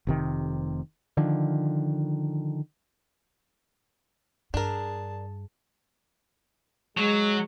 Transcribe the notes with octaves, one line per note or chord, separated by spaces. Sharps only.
F1 C3 D#3
D3 D#3 F3
G2 D4 G#4 A#4 A5
F#3 G#3